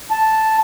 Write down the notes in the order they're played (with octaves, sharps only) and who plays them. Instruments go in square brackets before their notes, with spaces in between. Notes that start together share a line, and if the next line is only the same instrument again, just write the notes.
[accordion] A5